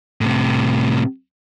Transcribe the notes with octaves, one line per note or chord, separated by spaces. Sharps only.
A2 C3